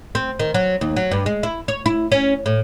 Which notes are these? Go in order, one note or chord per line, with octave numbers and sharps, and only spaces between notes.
C4
D#3
F#3
D#2
F#3
G2
G#3
E4
C#5
E4
C#4
A2